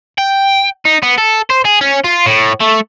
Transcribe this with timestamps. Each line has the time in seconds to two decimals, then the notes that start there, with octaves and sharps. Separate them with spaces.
0.18 G5
0.86 D#4
1.03 B3
1.18 A4
1.50 C5
1.65 G#4
1.81 C#4
2.04 F4
2.26 A2
2.61 A3